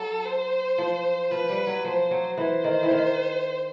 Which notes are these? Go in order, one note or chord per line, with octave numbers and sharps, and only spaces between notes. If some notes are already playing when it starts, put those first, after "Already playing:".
Already playing: F#3 A4
C5
F3
F3 B4
G3
F#3
F3 C5
F#3
E3 C5
D#3
E3
D#3